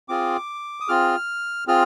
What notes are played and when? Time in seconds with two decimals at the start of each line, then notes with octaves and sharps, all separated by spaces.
0.09 C4 F4 G#4 D6
0.80 D#6
0.88 C4 F4 G#4 F6
1.67 C4 F4 G#4 F6